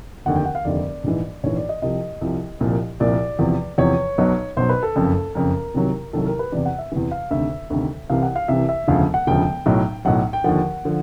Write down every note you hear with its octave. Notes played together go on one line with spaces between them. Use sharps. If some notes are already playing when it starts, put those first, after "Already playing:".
F1 D#2 D3 F#5
G5
F#5
F5
F1 D#2 D3 D5
A#1 G#2 E3
A#1 G#2 E3 C#5
D5
D#5
C2 C3 F3 D#5
C2 C3 F3
C2 A#2 F3
C2 A#2 F3 D5
E2 C3 F3
E2 C3 F3 C#5
B1 B2 F#3
B1 B2 F#3 C5
B4
A4
F#1 F2 C#3
F#1 F2 C#3 A#4
C2 C3 D#3 F#3
C2 C3 D#3 F#3 A4
A#4
B4
E2 C3 E3 D5
F#5
E5
E2 C3 E3
F5
D2 C3 D#3 E5
D2 C3 D#3
C2 C3 E3 F5
F#5
F5
C2 C3 E3 E5
E5
E1 D2 C#3 F3 F5
F#5
E1 D2 C#3 F3 G5
B1 A2 F#3
B1 A2 F#3 F#5
G5
D#2 D3 F3 F#5
D3 F3